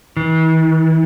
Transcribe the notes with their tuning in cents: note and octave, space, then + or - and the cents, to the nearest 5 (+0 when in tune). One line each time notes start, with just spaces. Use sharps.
E3 -40